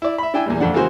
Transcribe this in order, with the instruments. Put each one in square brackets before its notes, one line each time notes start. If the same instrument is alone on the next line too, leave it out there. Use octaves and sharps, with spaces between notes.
[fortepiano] E4 D5
E5 B5
D4 E4 G5 G#5 E6
E2 A#2 G3
F2 A3 D4 F#5
C#3 E3 G#3 A#3 F#4 C5